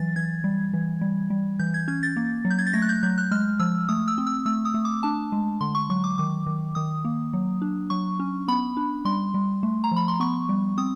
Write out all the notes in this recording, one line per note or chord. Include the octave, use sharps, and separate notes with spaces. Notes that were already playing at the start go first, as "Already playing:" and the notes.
Already playing: E3 F#3 A6
E3 G#6
G3
E3
G3
G3
E3 G6
G#6
C#4 G#6
A6
A#3
F#3
G6
G#6
A6
A3 A#6
F#6
G6
F#3 G6
F#6
G#3 F6
F3 E6
A3 D#6
E6
C4
E6
A3 E6
D#6
A3
D6
D4 A5
G#3
D3 C6
C#6
F#3 C#6
D6
D#3 D6
D#3
D#3 D#6
A#3
F#3
D4
F#3 C#6
C#4
B3 B5
D4
G3 C6
G3
A3
A#5
F3 B5
C6
B3 C#6
G3
C4 D#6